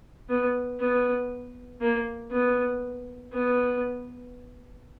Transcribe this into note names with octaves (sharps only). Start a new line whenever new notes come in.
B3
B3
A#3
B3
B3